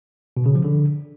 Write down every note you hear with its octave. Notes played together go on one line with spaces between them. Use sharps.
B2
C#3
F3
D3